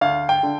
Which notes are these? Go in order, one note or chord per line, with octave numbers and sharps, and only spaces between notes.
D2 F5
G5
D3